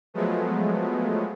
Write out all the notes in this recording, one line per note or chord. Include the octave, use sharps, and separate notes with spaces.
F3 F#3 G#3 A3 B3